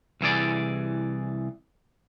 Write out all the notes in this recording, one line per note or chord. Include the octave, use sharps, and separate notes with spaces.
C2 E3 G#4 D5